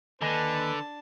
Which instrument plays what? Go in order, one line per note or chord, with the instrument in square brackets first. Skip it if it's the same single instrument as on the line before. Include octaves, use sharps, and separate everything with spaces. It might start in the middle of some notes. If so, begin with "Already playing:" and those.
[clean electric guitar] D#2 D#5 G#5 [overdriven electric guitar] D3 [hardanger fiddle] D4 A5 [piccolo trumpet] B4